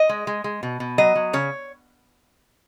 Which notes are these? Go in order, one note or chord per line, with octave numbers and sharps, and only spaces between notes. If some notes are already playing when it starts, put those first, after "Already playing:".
Already playing: D#5
G#3
G#3
G#3
B2
B2
F#3 D#5
F#3
C#3 C#5